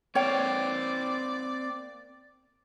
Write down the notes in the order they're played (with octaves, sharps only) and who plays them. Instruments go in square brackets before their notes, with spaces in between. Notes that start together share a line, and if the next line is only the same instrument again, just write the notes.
[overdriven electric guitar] A#3 C4 [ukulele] C#5 G5 [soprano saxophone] D5